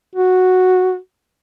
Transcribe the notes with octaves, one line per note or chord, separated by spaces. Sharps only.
F#4